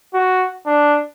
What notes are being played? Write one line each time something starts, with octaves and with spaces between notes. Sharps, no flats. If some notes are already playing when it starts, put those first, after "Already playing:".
F#4
D4